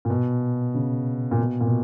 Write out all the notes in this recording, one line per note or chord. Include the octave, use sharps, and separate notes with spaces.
A#2
B2
C#3
A#2
B2
A#2
B2